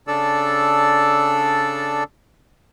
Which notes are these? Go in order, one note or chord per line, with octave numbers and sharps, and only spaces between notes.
C#3 D4 A4 D5 E6